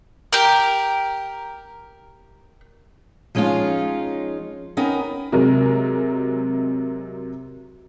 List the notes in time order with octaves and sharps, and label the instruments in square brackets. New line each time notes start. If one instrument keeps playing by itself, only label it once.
[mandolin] G4 A#4
[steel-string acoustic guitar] F3 G#3 C#4 D#4 F4
B3 C#4 D#4 A#4 G5
[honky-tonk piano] C3 F#3 G#3 A#4